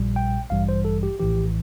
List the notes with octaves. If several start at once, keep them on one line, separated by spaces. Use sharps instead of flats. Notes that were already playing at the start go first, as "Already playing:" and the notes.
Already playing: A#1 A#2 G3
G5
A1 G2 E3 G3 F5
C5
A4
G4
A#1 A2 E3 G4